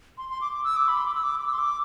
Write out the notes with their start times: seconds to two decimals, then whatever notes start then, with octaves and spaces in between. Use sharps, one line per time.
0.18 C6
0.29 C6
0.41 D6
0.52 D6
0.64 E6
0.77 D6
0.88 B5
0.97 C6
1.06 D6
1.14 E6
1.23 D6
1.41 D6
1.47 E6
1.53 C6
1.59 D6